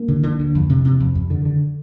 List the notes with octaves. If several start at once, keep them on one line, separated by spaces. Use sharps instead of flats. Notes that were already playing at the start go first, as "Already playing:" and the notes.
Already playing: A#3
D3
D3
D2
F2
C3
C3
F2
F2
D3
D3